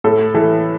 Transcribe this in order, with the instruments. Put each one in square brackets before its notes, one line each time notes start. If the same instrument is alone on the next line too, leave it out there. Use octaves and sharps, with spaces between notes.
[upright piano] A2 A4
E3 A4